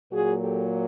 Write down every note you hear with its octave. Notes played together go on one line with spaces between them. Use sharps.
A#2 F#3 A#3 F#4 G#4
G4 A4